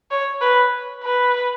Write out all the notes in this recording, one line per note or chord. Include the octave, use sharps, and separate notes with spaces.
C#5
B4
B4